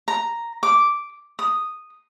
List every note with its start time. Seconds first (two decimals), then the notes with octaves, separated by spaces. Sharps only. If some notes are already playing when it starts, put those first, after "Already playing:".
0.08 A#5
0.63 D6
1.39 D#6